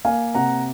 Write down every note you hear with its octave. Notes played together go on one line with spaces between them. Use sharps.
A#3 F5 G#5
C3 F#5 A#5